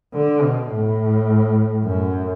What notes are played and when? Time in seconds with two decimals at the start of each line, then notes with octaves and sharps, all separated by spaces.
0.14 D3
0.43 B2
0.71 A2
1.84 F#2